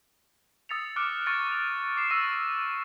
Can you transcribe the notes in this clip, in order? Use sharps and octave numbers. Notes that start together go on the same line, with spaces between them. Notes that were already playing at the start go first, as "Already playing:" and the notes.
D#6 E6 A6 B6 C#7 F7
D6 F6 F#6 A6 C#7 D7
C#6 A6 C#7 D7
F7
D6 C7 E7
C#6 E6 A#6 D#7